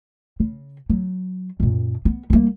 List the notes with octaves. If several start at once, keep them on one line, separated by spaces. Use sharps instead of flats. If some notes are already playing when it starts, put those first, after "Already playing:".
C#3
F#3
F#2 A#2
B3
G3 A#3